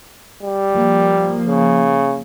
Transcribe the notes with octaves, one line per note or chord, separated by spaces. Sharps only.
G3
F3 A#3
C#3